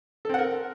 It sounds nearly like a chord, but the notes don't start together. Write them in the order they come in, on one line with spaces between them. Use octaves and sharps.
A4 C4 F#5 A#4